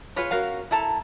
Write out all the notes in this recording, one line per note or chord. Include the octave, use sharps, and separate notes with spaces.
F4 G#4 B4 C#5
C#4 F#4 A#4 F5
E4 A4 A5 A#5